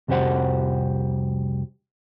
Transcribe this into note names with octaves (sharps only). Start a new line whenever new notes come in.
C2 F2 F#4 G4 C5 F#5